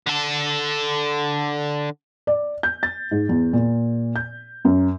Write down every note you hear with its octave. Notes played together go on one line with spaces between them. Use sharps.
D3 A4
D5
G6
A6
G#2
E2
A#2
G6
F#2